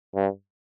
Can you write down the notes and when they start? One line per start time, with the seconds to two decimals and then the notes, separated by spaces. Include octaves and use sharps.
0.15 G2